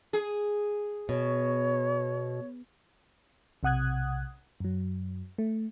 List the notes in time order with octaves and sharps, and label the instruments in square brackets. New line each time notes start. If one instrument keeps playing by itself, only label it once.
[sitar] G#4
[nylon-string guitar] B2 [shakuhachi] C#5
[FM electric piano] B1 C3 F#5 D#6 F#6 G#6
F#2 F#3
A3